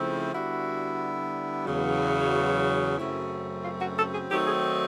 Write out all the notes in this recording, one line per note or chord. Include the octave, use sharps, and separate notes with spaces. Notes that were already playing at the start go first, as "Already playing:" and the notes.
Already playing: C#3 F3 A3 C4 E4
D3 G3 B3 E4 F#4
E2 C#3 F#3
F#2 C#3 F#3 A3 C4 E4
F4
F#4
A4
G#4
D#3 F#3 A3 C4 D#4 G4
G#4